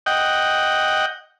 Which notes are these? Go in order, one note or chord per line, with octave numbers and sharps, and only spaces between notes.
D#5 F#5 G5